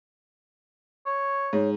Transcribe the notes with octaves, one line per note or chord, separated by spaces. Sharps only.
C#5
G#2 C#5